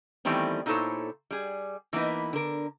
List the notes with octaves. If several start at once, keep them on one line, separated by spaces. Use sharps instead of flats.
D#3 E3 G3 A3 B3 C4
A#2 D#4 E4 A4 C5 C#5
G3 G#4
E3 A#3 B3 D#4 B4
D3 A#4